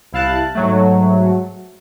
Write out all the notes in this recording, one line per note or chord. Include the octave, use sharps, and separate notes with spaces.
C2 E4 F5 A5 F#6
G#2 F#3 A3